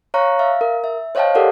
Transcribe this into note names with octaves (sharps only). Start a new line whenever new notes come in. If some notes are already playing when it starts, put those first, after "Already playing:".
C#5 F5 A#5 C#6 F#6
E5 F5
A#4
E5
C5 C#5 D#5 F5 G5 A5
G4 A4 A#4 D5 F#5